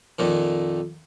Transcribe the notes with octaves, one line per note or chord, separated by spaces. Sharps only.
F2 A#2 D#3